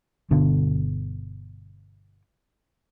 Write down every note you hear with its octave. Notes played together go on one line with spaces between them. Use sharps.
G1 B2 D3